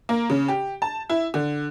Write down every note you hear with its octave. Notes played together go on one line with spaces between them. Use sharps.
A#3
C#3
G4
A5
E4
D3